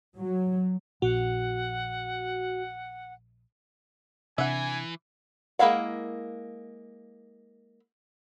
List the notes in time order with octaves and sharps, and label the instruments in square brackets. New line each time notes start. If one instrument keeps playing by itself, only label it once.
[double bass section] F#3
[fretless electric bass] A#1 [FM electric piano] F#4 [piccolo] F#5
[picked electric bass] C3 D4 [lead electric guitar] E3 [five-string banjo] E5 F#5 [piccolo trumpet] G#5
[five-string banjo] G#3 A#3 E4 F5 F#5